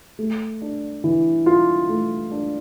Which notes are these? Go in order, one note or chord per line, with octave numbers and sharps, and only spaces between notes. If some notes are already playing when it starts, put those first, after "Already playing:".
A3
D4
E3
F4
A3
D4